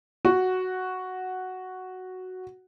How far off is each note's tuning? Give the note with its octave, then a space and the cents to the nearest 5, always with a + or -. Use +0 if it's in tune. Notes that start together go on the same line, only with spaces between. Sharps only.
F#4 +0 F#5 +0